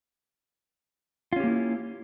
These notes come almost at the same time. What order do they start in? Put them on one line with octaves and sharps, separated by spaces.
F4 C#4 G4 A#3 E4